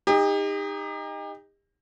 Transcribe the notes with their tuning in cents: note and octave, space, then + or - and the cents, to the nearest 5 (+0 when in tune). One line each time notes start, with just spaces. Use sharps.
D#4 +0 G4 +40